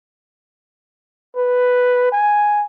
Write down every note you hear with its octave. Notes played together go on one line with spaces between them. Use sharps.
B4
G#5